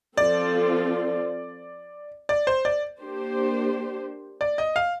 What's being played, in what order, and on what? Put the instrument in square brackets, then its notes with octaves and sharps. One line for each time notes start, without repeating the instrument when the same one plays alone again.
[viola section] F3 C4 F4 A4 [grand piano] D5
[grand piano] D5
C5
D5
[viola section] A#3 D4 G4 C5
[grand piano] D5
D#5
F5